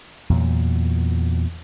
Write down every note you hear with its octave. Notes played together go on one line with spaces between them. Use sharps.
E2 A#2 F#3